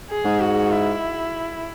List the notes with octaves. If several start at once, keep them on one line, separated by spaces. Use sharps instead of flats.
G#4
G#2
F#4
E4